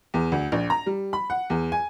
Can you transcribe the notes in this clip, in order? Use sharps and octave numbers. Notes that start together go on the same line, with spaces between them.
E2
D2
A#1
A#5
G3
B5
F#5
E2
G#5